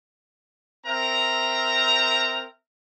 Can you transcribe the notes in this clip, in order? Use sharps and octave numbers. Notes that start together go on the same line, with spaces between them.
C4 A#4 E5 A#5